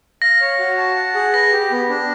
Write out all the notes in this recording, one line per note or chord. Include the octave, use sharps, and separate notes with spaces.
F5 A#6
C#5
F#4
A5
F#5
G#4
B4 A#6
G4
B3
D4